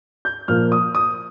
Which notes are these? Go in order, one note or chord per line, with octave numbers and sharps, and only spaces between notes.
G6
A#2 F3 A#3 F6
D#6
D#6